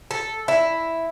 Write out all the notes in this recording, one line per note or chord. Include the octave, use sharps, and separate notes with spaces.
A4
E4